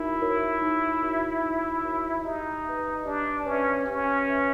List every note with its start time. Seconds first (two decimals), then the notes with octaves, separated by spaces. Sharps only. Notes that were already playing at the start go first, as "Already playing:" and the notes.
Already playing: D#4 E4 F#4 A#4 C#5
0.21 F#4 A#4 C#5
0.62 D#4
1.03 F#4 A#4 C#5
1.43 D#4
1.83 F#4 A#4 C#5
2.24 D#4 G4
2.65 B4 E5
3.05 D4 G4
3.46 C#4 B4 E5
3.86 C#4 G4
4.27 B4 E5